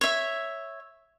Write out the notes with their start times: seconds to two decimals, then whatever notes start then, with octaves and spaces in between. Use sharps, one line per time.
0.01 C#5 E5